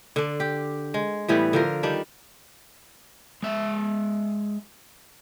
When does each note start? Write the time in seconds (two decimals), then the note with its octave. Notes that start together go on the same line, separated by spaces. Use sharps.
0.16 D3 D4
0.40 G4
0.94 G#3
1.28 A2 E3 G3 B3
1.53 D3 F3 A#4
1.83 D#3 G3 D4
3.43 G#3 E5